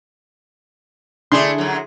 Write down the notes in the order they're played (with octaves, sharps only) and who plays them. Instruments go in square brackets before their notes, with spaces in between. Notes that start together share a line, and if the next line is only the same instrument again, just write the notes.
[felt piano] D3 [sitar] A3 D4 [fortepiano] E4 G#4 C6
[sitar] F#2 F#3